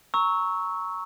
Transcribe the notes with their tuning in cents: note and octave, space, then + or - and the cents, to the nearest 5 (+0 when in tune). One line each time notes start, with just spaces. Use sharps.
A#5 +0 C#6 +0 E6 -20